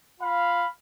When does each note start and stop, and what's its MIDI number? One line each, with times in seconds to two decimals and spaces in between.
0.20 0.65 65
0.20 0.65 77
0.20 0.65 83